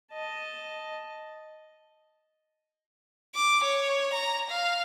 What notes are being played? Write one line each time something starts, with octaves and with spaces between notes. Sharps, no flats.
D#5 A5
D6
C#5
A#5
F5